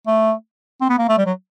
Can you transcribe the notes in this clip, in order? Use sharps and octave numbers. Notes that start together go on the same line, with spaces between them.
A3
C4
B3
A#3
A3
G3
F#3